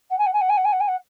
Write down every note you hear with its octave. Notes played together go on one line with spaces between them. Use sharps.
F#5
G#5
F#5
G#5
F#5
G#5
F#5
G#5
F#5
G#5
F#5